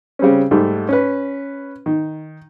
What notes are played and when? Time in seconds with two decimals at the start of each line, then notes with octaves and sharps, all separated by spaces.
0.19 C#3 G3 C4 C#4
0.51 G#2 G3 A3
0.89 C#4 B4
1.86 D#3